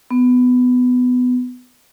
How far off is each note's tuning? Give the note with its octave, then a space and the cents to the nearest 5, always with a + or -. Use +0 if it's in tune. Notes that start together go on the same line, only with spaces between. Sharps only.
B3 +15